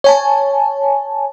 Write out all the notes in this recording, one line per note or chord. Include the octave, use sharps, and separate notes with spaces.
C#5 G#5 A5